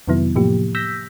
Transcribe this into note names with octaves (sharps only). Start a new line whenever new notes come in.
F2 C3 D#3 F#3 B3 E4
A2 C3 F3 A#3 G4
E6 G6 A#6 B6